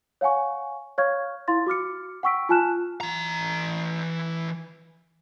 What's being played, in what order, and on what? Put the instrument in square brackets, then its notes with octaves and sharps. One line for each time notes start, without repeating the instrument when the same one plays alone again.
[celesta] C#5 F5 F#5 G#5 C#6
C#5 F5 C#6 F6 G#6
E4 F5 C6 A6
F#4 D6 F6 C#7
F#5 G5 C#6 E6 B6 D7
F4 G#5 A5 F6 F#6 E7
[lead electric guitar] E3 A#5